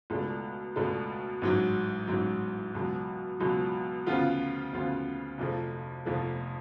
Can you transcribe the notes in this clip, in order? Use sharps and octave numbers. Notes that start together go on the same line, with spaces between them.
C#2 B2 A3 D4
C#2 B2 A3 D4
A1 G#2 F#3
A1 G#2 F#3
C#2 B2 F#3
C#2 B2 F#3
D2 C#3 F3 B3 F4
D2 C#3 F3 B3 F4
F1 F2 F3 A3
F1 F2 F3 A3